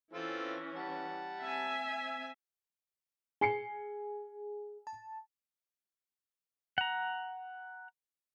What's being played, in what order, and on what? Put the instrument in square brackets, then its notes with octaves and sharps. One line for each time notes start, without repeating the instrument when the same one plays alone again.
[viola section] E3 C#4 [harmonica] C4 F4 A4
[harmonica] G3 F#5 A5
[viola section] C4 E5 G#5
[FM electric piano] G#4 [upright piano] G#5 C7 C#7
[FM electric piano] A5
[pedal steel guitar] F#5 A#5